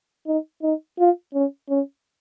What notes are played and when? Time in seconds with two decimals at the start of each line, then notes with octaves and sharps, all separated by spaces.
0.27 D#4
0.63 D#4
0.99 F4
1.34 C#4
1.70 C#4